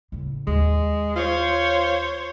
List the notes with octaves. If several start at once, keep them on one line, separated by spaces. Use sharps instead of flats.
A2 C#3
D#2 G#3
F4 C5 C#5